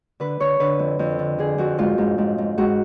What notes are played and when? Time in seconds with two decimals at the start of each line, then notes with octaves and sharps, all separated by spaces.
0.20 D3 B4
0.40 D3 C#5
0.59 D3 B4
0.79 F2
0.99 F2
1.19 D3
1.38 D3 G#4
1.58 F2 F#4
1.78 G#2 F4
1.98 G#2
2.18 G#2
2.38 G#2
2.58 G#2 F#4